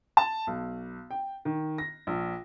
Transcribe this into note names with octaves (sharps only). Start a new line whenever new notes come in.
A5
B1
G5
D#3
A#6
A#1